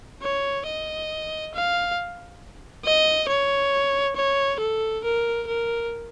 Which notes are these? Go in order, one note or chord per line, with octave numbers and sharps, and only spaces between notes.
C#5
D#5
F5
D#5
C#5
C#5
A4
A#4
A#4